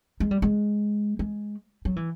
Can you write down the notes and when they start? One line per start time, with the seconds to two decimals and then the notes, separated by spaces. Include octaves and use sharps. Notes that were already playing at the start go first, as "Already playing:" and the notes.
0.20 G#3
0.31 G3
0.42 G#3
1.19 G#3
1.85 F#3
1.96 E3